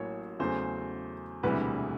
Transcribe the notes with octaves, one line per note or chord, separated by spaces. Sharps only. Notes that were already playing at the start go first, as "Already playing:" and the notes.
Already playing: A1 A2 F#3 A#3 C#5
E2 C#3 F#3 A3 C5
E1 D2 C3 E3 G3 B4